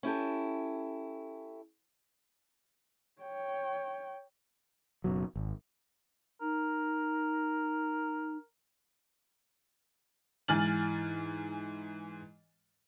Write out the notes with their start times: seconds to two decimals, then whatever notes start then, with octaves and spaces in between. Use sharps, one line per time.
0.03 C#4 E4 G4 A4
3.22 C#5 G5
5.04 F#1 B2 F#3
5.36 G#1
6.41 D#4 A#4
10.48 G#2 E3 G#5 F6 A6 F#7